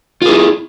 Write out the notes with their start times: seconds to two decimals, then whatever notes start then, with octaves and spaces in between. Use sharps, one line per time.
0.22 F4
0.25 G#4
0.29 E4